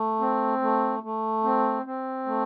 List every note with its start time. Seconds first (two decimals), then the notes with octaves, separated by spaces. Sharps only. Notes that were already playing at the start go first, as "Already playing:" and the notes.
Already playing: A3
0.20 C4
0.62 A3
1.03 A3
1.44 C4
1.86 C4
2.26 A3